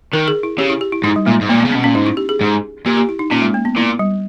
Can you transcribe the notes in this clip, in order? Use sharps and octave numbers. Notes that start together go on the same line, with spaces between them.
D#3 A#4
G#4
E4
C#3 G4
E4
G4
E4
G#2 D#4
G3
A#2 G#3
G#2
A#2 A#3
B3
C#3
B2 C#4
A#2 C#4
G#2 D#4
E4
G4
G#4
G#2
A#2 G4
G4
E4
D#4
A#2 C#4
G#3
A#3
B3
A#2 E4
G3